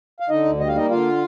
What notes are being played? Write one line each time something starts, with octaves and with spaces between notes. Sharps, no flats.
F5
D3 D#4 D#5
D2
G3 D#5
F5
A#3 D#4 D#5
D3 F4 F5